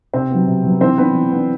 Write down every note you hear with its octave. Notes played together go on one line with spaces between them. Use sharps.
C3 C4 C5
F#3 B3
C3
F#3 B3
E3 C4 C5
B3 D4 B4
E3
B3 D4